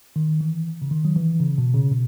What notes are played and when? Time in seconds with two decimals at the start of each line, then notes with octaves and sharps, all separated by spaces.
0.16 D#3
0.41 E3
0.82 C#3
0.91 D#3
1.05 F#3
1.16 E3
1.40 C#3
1.58 B2
1.74 C#3
1.91 B2